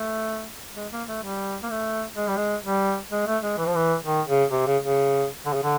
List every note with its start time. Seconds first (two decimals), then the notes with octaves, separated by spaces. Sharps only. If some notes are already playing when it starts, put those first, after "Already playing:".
Already playing: A3
0.76 G#3
0.92 A#3
1.08 A3
1.23 G3
1.63 A#3
1.71 A3
2.16 G#3
2.28 G3
2.37 G#3
2.65 G3
3.11 G#3
3.27 A3
3.43 G#3
3.58 E3
3.66 F3
3.75 E3
4.05 D#3
4.28 C#3
4.51 C3
4.67 C#3
4.83 C#3
5.46 D3
5.54 C#3
5.63 D3